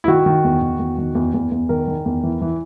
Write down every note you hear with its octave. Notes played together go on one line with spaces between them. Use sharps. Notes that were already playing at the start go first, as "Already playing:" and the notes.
E4
D#3 F#4
D#3
E2
D#3
E2
D#3
E2
E2
E2
D#3 A#4
D#3
E2
E3
E3